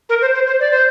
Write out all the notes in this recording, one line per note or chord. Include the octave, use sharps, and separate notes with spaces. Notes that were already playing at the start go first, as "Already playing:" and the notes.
A#4
C5
C5
C5
D5
C5